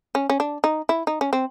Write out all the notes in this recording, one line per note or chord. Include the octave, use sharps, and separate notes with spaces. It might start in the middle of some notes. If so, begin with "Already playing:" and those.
C#4
C#4
D4
D#4
E4
D#4
C#4
C4